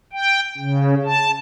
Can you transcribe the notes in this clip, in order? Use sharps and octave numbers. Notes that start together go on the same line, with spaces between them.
G5
C#3
A5